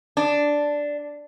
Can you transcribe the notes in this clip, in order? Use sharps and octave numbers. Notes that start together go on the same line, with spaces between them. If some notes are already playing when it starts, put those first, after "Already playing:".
D4